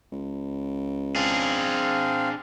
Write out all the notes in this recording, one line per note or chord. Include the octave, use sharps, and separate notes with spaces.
C#2
C4 D4 G#4 F5